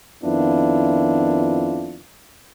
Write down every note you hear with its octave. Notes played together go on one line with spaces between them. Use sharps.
F2 D#3 B3 D4 E4 F4